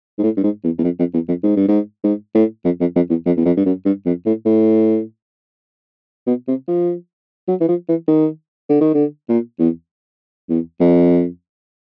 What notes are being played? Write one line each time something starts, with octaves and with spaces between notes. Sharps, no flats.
G#2
A2
G2
G#2
E2
E2
F2
F2
E2
F2
G#2
G2
G#2
G#2
A2
F2
F2
F2
E2
F2
E2
F2
G2
F#2
G2
F2
A2
A2
B2
C3
F3
F#3
E3
F3
E3
D#3
D3
D#3
D3
A#2
E2
E2
F2